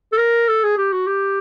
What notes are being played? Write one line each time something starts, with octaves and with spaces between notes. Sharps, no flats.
A4
A#4
A4
G#4
G4
F#4
G4